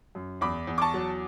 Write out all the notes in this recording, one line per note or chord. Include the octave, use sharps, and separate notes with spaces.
F#2
E2 B5 D6
E2
D6
A5 C#6
F#3